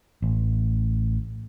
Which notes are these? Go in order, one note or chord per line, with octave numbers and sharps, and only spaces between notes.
A1